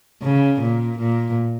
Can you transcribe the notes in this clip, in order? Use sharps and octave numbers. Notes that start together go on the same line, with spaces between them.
C#3
A#2
A#2